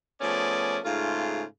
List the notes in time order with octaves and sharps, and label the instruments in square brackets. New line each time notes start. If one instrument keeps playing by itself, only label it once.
[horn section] F3 A3 B3 C#4 G#4 D5
G#2 C#3 A3 F4